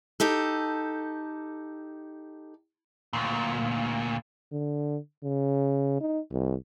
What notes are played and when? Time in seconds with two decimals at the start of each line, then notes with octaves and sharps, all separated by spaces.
0.20 D#4 G4 A4
3.13 D2 A#2
4.52 D3
5.23 C#3
6.01 D#4
6.32 C2